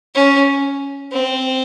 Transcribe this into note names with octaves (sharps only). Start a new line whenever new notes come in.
C#4
C4